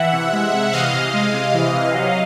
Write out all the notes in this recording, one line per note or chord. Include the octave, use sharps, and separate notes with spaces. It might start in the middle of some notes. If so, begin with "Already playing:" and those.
Already playing: E3 E5 F#5
C3
G#3
C3
E3 D#5 F5
C3
G#3
C3
E3
C3
F#3